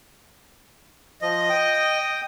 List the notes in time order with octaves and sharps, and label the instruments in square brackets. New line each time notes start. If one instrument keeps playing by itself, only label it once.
[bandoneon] F3 [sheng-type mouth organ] D#5
[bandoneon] G5 D#6